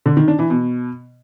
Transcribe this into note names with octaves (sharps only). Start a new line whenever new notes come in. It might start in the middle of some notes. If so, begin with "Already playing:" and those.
D3
D#3
D4
E3
B2